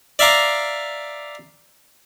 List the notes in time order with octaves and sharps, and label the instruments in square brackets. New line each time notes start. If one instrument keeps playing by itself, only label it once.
[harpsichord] D5 E5 F5 A#5 D6